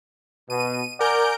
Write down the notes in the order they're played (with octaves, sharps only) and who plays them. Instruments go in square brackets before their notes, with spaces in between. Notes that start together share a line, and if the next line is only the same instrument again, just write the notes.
[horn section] B2 [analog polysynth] D#7
[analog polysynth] A#4 G6 D7 [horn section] D5 F#5 G#5